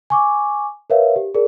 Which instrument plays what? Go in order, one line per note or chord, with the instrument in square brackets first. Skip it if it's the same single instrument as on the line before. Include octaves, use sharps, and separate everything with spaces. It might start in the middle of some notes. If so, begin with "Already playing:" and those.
[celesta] G#5 C#6 D6
A#4 B4 C#5 E5 F5
G4
G#4 A#4 D5